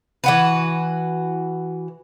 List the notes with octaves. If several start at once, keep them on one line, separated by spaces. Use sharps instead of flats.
E3 F#4 B4